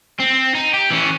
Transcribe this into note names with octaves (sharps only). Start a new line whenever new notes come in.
C4
D#4
G4
E3 C#4